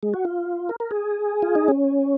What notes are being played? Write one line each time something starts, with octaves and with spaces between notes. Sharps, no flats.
G#3
F#4
F4
A#4
A#4
G#4
F4
D#4
C#4